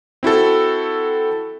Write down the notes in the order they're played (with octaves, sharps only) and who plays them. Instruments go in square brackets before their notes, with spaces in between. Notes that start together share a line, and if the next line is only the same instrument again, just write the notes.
[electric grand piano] C4 E4 F#4 A4